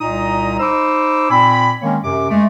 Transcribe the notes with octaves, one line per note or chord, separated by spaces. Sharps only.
C2 A#2 D#4 D#5 A#5 D#6
D#4 C5 B5 D6 E6
A#2 C4 G#5 B5
D#3 G#3 A#3 C4 C#4 C#5
F#2 C3 D6
G#3 A3